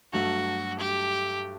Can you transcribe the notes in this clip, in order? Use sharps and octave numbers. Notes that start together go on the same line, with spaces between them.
G2 F#3 A3 F#4
G4